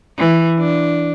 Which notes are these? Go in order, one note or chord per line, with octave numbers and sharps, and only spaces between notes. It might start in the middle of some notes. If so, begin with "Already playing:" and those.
E3
D4